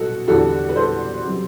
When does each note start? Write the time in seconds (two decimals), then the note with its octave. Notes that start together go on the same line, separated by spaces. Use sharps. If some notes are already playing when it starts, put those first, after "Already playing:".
Already playing: B2 F#4 A4
0.28 E2 D3 G3 F#4 A4
0.69 B4
0.76 A4 C5
1.26 C3 F#3